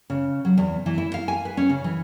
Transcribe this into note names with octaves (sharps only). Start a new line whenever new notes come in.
C#3
F#3
E2
E3
E4
F5
G#5
B4
C#4
C#3
E3